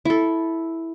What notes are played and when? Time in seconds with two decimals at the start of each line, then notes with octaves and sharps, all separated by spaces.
0.05 E4 A4